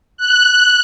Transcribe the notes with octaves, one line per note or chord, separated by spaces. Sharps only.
F#6